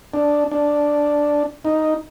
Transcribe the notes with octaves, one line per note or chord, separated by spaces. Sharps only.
D4
D4
D#4